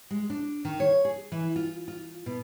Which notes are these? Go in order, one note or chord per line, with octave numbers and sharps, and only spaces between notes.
G#3
D4
D#3
C#5
G#4
E3
F4
F4
B2